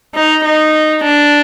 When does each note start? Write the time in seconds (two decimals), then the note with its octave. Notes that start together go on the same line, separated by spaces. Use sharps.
0.15 D#4
0.45 D#4
1.04 D4